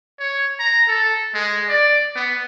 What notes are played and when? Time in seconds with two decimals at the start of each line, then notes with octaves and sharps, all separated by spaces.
0.19 C#5
0.59 A#5
0.88 A4
1.34 G#3
1.69 D5
2.16 B3